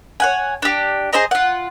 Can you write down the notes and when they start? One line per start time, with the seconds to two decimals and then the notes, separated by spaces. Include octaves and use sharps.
0.20 C#5 F#5 G#5
0.62 D4 G4
1.13 G#4 C5 D#5 A#5
1.31 F4 F#5